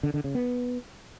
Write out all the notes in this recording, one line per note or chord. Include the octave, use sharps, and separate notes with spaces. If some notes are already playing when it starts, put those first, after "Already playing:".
D3
D3
C#3
B3